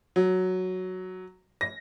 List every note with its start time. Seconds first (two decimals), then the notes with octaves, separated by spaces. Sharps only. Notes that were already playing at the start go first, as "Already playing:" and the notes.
0.16 F#3
1.61 A#6